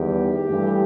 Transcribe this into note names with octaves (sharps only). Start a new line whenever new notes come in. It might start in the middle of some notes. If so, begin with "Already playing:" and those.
Already playing: E2 D#3 G3 G4
G2 E3 A3